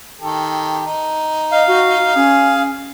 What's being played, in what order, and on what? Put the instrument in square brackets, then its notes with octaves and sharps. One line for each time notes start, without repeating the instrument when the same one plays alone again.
[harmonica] D#3 G4 A4
D#4
[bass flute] D#5 [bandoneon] F5
[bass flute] F#4
[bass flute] C#4 [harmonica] G#4